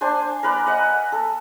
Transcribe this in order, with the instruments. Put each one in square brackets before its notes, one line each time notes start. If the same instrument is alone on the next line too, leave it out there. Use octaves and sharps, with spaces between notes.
[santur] D4 C5 G#5
A#4 B4 D5
D#5 F#5
A4